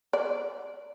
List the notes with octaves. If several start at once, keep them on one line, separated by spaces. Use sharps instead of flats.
D5